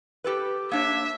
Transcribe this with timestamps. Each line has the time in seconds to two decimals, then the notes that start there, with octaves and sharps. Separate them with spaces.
0.24 G4 A4 B4
0.72 A#3 D4 C#5 E5